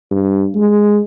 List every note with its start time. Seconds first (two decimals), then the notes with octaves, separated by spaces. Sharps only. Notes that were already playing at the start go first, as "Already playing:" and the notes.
0.11 G2
0.55 G#3